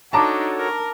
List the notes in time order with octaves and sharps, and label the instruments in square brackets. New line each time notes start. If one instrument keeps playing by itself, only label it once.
[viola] D4 D#4 [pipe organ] F#4 A4 C#5 [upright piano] A5 A#5 D6
[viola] A#4